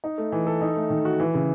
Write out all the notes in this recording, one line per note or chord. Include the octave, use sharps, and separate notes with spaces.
D#4
A3
E3
A4
D#4
A3
D#3
F#4
E3
C#3